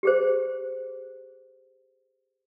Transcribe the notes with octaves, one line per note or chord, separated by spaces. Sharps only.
G4 G#4 C5